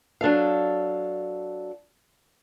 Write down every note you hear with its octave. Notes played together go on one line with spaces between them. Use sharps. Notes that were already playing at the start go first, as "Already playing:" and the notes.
F#3 D4 A4 F5